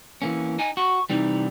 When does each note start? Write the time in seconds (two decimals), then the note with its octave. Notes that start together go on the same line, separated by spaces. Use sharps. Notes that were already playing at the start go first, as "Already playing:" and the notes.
0.22 E3 A#3 C#4
0.59 D#4 G#5
0.77 F#4 C#6
1.10 C3 E3 G3 D#4